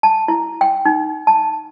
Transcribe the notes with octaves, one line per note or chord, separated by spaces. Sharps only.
A5
E4
G5
D#4
A5